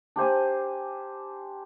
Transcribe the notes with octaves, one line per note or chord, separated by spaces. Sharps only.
D4 G4 C5 G#5